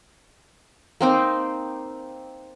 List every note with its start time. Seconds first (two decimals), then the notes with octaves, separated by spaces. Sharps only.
1.01 A#3 C4 D#4